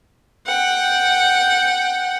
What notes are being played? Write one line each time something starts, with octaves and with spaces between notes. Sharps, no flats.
F#5 G5